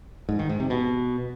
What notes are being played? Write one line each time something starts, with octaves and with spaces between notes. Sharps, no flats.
G#2
D#3
G#2
C3
B2